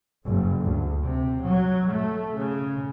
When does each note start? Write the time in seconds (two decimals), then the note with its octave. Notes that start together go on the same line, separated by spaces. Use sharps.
0.26 F#1
0.65 D2
1.04 C3
1.47 F#3
1.90 A3
2.37 C#3